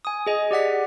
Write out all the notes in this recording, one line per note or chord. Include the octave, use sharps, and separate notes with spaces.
G#5 D#6
G#4 D#5 G#5
G4 D5 F#5 B6